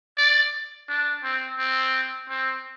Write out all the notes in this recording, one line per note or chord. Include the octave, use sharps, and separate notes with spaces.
D5
D4
C4
C4
C4